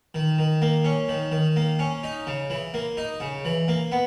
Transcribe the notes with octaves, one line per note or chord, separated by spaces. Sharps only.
D#3
D#3
A#3
C#4
D#3
D#3
A#3
C#4
D#4
C#3
E3
A#3
D#4
C#3
E3
A#3
B3